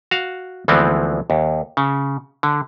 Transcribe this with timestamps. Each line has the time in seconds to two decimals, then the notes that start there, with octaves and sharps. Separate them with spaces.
0.11 F#4 F5
0.68 D2 E3 F3 G#3 B3 C4
1.30 D#2
1.77 C#3
2.43 D3